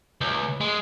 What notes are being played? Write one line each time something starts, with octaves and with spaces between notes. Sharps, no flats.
C#2
G#3